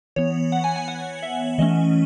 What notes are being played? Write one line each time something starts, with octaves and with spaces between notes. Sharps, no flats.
E3 B3 C#5
F#5
G#5
G#5
F#5
E5
E3 A3 C#4 D#5